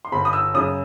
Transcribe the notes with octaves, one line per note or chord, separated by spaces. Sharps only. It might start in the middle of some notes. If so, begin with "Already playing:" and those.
C6
G1 B5
D#6
E6
F#2 C#3 D#6